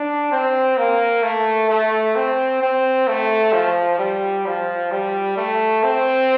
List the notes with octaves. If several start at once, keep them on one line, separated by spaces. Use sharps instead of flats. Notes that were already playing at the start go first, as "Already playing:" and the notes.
Already playing: D4
C4
A#3
A3
A3
C4
C4
A3
F3
G3
F3
G3
A3
C4